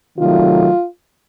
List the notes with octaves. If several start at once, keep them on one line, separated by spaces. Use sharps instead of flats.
C3 D#3 F#3 A3 F4